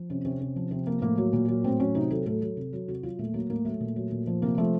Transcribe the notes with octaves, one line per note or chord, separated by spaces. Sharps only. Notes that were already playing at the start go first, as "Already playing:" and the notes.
Already playing: F3
C3 C#4
C3 C#4
C3
F3
C3 C4
F3 A#3
A2 A#3
F#3
A#2
F#3
A2 C4
F#3 C#4
C3 D#4
F#3 A4
A2 A4
F#3
C3
F#3
C3 F#4
F#3 F4
A#2 A3
F#3 A#3
A2 A#3
F#3 A3
A#2
F#3
A#2
F3
C3 A#3
F3 A3